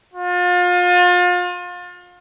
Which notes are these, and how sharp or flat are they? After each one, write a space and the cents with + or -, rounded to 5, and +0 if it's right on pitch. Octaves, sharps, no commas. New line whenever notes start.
F4 +35